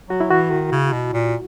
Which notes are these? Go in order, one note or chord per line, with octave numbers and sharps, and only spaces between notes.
F#3 F#4
E4
E3 F#4
D#3
C#3
B2
A#2